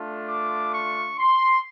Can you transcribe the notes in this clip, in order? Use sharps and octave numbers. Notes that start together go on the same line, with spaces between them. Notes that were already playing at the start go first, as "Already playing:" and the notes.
Already playing: A3 D4 F4
D6
C#6
C6